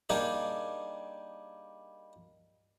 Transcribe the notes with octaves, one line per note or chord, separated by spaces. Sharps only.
G3 A#3 D4 D#4 G#4 C5